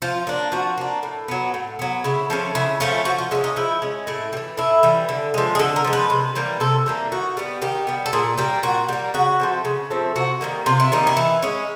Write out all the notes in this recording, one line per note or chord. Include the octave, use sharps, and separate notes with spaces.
F3 F4
A#3 D4
F3 F#4
A#3 D4
A2
F#3 B3
A2
F#3 B3
C#3 E4
F3 A3 C#4
C#3 E4
F3 A3 C#4 F4
F3 F#4
F4
G#3 C#4 E4
D#4
F3 E4
G#3 C#4
A2 E4
G3
E3
A2 E4
E3 G3
D3
F3 G#3
G#4
D3 A4
A#4
F3 G#3
B4
C3
E3 G3 A#3
C3 A4
E3 G3 A#3
D#3 F#4
G3 B3
D#3 G4
G3 B3
A4
A#2 G#4
G3 A#3 G4
A#2 F#4
G3 A#3
C#3 F#4
F3 A3 C4
C#3
F3 A3 C4
C3 F#4
D#3 G3 A#3
C3 F4
E4
D#3 G3 A#3 D#4
E4
E3
G#3 C#4